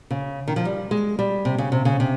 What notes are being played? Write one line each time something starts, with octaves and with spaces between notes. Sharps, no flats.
C#3
D#3
F3
G3
G#3
G3
C3
C#3
C3
C#3
C3